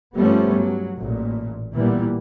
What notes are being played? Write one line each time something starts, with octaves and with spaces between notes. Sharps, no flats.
G2 F3 G3 A3 B3 C#4
F#3
A1 A#2
A#2 E3 G3 A#3 B3